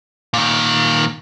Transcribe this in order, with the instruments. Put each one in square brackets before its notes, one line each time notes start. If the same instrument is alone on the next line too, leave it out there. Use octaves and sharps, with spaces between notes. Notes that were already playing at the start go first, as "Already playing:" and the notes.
[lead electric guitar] A#2 D#3